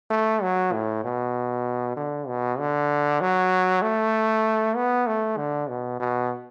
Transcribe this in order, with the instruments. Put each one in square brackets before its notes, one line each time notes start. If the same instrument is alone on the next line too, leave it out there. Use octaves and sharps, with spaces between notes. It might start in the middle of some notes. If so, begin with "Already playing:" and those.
[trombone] A3
F#3
A2
B2
D3
B2
D3
F#3
A3
B3
A3
D3
B2
B2